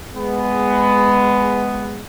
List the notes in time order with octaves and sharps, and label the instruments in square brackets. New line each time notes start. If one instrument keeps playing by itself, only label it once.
[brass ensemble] G#3 B3